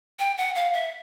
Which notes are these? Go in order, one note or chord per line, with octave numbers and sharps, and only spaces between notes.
G5
F#5
F5
E5